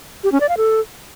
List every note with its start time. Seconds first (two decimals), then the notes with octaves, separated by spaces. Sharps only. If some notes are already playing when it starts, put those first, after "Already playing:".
0.24 G4
0.32 C#4
0.40 D5
0.49 F5
0.57 A4